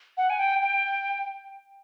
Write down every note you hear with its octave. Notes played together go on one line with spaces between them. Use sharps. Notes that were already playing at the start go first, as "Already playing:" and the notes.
F#5
G#5
G5
G5